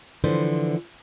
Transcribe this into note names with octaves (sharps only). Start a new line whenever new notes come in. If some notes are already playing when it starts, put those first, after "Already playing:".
D3 E3 F3 B4 C5